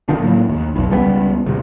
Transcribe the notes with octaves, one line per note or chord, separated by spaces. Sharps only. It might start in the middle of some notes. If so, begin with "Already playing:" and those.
D3 D#3 F3 D4
A2 F#3 A#3
D#2
F1 B1
C#2 G3 A3 B3
D2 C3